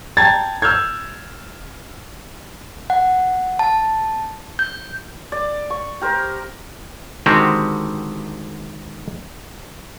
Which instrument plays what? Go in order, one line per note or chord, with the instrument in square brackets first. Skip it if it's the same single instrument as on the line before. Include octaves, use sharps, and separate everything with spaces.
[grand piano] G5 A5 A#5 G#6 A6
E6 F6 G6 G#6
[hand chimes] F#5
A5
G6
[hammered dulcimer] D5
C#6
G4 A#4 C5
[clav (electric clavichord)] D3 D#3 G#3 C4 F#4 G4